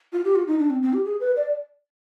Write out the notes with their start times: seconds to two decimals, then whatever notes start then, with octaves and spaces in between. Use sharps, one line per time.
0.13 F4
0.25 G4
0.35 F4
0.47 D#4
0.59 D4
0.70 C4
0.82 C4
0.93 G4
1.05 G#4
1.20 B4
1.36 D5